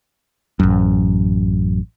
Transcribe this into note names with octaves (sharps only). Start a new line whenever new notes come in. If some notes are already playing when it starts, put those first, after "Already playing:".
A1 F#2